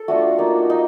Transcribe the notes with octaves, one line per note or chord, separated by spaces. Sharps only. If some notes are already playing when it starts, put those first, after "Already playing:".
Already playing: A4
A3 D4 F4 F#4
A#3 D#4
D#4